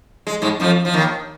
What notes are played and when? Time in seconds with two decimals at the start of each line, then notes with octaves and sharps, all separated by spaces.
0.27 G#3
0.42 G#2 G#3
0.60 F2 F3
0.85 F3
0.94 D#2 D#3